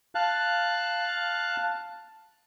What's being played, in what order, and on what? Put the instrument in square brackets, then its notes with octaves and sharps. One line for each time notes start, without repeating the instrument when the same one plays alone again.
[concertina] F5 A5 F#6